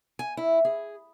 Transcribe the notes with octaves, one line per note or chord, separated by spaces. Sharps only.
G#5
E4
G#4